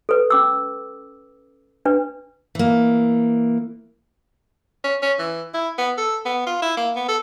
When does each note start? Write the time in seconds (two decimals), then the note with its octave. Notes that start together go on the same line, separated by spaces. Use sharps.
0.09 A4 B4
0.30 C#4 D6 E6
1.85 D4 B4
2.55 E3 A#3
4.84 C#4
5.02 C#4
5.19 E3
5.54 E4
5.78 B3
5.97 A4
6.25 B3
6.47 F4
6.62 E4
6.77 A#3
6.95 B3
7.08 A4